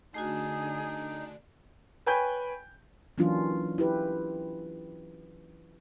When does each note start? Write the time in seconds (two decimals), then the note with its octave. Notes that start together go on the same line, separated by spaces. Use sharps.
0.14 D3 A3 D4 D#4 F#4 G#4
2.06 B4 C#5 G5 G#5 B5 G6
3.18 E3 F#3 A#3 C#4 D4 F4
3.78 E4 G4 B4